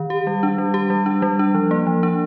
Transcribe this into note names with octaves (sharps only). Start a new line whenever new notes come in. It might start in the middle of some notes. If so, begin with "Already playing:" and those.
Already playing: D#3
G4
G3
D4
G3
G4
G3
D4
G3
D4
F3
A#3
F3
D4